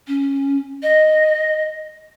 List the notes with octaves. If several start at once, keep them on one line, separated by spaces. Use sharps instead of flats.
C#4
D#5